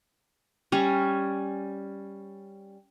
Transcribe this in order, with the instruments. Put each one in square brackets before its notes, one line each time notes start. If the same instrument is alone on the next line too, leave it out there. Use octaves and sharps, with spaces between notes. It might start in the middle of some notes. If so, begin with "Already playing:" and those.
[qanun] G3 C#4